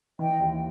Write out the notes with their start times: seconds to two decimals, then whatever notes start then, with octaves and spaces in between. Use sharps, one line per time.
0.19 E3 D#5 G5
0.40 D#2